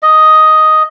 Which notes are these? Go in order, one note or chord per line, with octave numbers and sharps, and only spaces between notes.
D#5